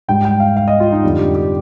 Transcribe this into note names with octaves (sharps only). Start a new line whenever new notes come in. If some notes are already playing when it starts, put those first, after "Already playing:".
G#2 G3 G5
G5
F5
F5
D#5
F4
D#4
F2 D3 G3
G4
G4